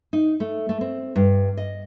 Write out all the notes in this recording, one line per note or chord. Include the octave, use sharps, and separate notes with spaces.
D#4
A3
A3
C4
G2
D#5